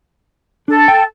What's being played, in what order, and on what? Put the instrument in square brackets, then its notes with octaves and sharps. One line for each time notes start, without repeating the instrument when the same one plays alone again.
[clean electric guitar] D4 [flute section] A4
[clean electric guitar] G5